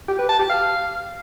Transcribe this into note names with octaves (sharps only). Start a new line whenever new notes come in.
G4
B4
A5
G4
F5